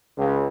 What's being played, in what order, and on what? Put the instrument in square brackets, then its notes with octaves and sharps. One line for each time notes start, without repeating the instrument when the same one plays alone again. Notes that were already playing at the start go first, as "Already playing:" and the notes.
[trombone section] C#2